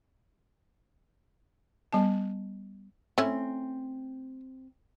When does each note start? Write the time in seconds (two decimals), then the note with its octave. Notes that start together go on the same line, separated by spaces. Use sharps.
1.93 G3 B3 A5
3.18 A3 C4 C#4 E4